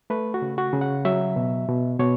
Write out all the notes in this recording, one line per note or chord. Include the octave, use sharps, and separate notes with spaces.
A3 B4
F#4
C#3
F#4
C#3
F#5
F#3 E5
B2
B2
B2 C#5